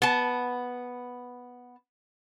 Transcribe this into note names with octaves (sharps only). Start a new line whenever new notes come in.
B3 A5